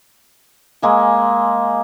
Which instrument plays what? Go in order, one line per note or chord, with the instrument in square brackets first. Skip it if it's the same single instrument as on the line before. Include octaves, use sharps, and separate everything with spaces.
[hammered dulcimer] G#3 A#3 G#5